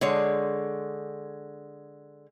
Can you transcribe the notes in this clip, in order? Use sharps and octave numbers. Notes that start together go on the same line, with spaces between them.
D3 G#3 C#5